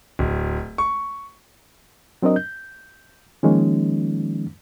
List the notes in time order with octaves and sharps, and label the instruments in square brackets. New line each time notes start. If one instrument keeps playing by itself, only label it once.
[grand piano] D1
C#6
[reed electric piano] F#3 C4 D4 A#4 D#5
G6
D#3 F3 G#3 A#3 C#4 D#4